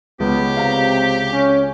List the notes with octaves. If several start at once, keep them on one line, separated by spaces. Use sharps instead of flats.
C#2 B3 G4
C3 F5 A#5
C#4